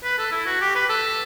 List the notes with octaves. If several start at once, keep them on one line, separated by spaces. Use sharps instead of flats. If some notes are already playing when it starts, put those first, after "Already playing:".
B4
A4
E4
F#4
G4
B4
A4